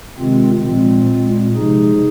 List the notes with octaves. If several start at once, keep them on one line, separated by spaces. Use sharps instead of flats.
C3 D#3 G#3 C4 F4
A#2 F3 G#3 C4 F4
A#2 G#3
C3 F3 G#3 D#4 G#4